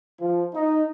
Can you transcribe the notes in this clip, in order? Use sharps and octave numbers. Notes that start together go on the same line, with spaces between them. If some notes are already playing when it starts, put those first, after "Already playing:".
F3
D#4